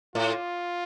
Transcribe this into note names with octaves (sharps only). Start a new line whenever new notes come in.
A2 F4